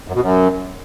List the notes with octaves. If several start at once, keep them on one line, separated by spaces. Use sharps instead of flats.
F#2
B2
F#2